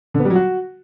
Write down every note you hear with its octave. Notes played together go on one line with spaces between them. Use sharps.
D3
B3
G3
F#3
F#4